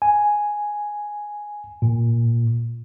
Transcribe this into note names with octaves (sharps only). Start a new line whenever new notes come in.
G#5
A#2